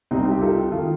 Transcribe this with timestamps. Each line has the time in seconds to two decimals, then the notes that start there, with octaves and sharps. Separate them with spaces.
0.11 C2 C3 G3 C4 D#4
0.31 G4
0.41 F4 A4
0.71 D#3 F4 A4